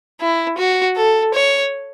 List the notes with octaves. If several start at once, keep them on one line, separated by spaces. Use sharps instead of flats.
E4
F#4
A4
C#5